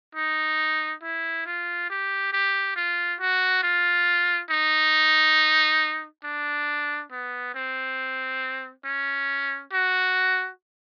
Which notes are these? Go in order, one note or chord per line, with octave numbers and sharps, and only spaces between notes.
D#4
E4
F4
G4
G4
F4
F#4
F4
D#4
D4
B3
C4
C#4
F#4